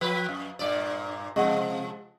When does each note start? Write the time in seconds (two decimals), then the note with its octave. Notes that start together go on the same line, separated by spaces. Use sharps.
0.01 F3 B4
0.29 F#2
0.59 G2 A#2 D5
1.36 C3 F3 G#3 D#5 F#5